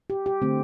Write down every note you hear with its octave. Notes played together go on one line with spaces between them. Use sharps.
G4
G4
D3 A3 C4